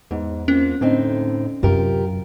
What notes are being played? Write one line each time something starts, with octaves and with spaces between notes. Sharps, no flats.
E2 G#2
A#3 C4 C#4 F4
A2 D3 C4 D#4
F#2 C3 F4 G4 A#4